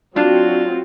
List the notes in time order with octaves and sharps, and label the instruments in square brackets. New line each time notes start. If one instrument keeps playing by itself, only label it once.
[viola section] F#3 C4 F#4 [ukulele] D4 [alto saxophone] F4